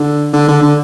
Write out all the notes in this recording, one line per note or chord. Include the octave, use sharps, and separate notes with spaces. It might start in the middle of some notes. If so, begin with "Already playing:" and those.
Already playing: D3
D3
D3
D3